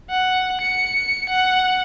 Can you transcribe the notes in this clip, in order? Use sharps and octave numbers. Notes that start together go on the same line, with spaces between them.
F#5
C#7
F#5